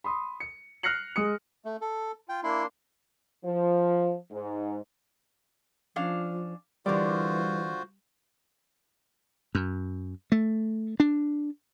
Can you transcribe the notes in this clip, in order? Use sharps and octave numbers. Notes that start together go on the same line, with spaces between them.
B5 C6 D#6
C#7
F6 F#6 A#6 C7 C#7 F#7
G#3 D#6 C#7
A3
A4
F4 G5
A#3 D4 E4 C6
F3
G#2
F3 C#4 D4 F5
D3 E3 G3 F4 F#4 A#4 C5 D5
F#2
A3
D4